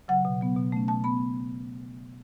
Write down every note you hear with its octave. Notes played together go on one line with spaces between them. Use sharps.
C#3 F#3 F#5
B2
F#3 B3
B2
A3 C#4
B2 A5
B3 B5